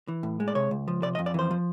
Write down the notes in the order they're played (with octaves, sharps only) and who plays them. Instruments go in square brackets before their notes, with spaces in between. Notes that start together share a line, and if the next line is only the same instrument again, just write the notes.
[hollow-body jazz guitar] E3
A2
G#3
D5
C3 C#5
C#2
F3
C3 D5
D#5
F2
D5
E3 C5
F3